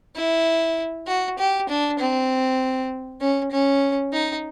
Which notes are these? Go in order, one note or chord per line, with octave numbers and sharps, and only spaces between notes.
E4
F#4
G4
D4
C4
C#4
C#4
D#4